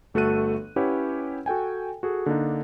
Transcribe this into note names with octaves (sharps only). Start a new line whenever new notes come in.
G1 A3 F#4 A4 F#6 D#7
C#4 E4 G4 B4 C#5 F#5
F#4 A4 G5 G#5
F#4 G#4 A4
D3 A#3 D4 D#4